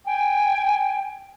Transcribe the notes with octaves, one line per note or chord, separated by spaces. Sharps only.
G5 G#5